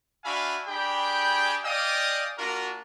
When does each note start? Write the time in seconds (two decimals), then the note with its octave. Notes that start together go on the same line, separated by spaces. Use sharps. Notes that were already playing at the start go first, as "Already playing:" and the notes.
0.24 D4 F#4 E5 F5 G#5 B5
0.67 D4 G4 G#4 G5 B5
1.63 D5 D#5 F5 G5 G#5 D#6
2.38 A#3 D4 F4 F#4 A#4